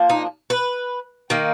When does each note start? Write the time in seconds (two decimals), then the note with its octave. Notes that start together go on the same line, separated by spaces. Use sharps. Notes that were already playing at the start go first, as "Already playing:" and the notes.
Already playing: F3 A#3 D4
0.10 D#4
0.50 B4
1.30 D#3 A#3 D#4